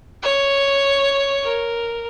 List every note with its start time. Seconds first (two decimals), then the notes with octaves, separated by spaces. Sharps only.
0.22 C#5
1.43 A#4